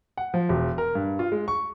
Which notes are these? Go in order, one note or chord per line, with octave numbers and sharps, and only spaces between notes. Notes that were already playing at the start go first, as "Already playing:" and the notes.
F#5
F3
E1
A#4
G2
F4
G#3
C#6